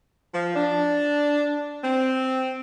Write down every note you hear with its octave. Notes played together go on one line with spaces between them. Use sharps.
F3
D4
C4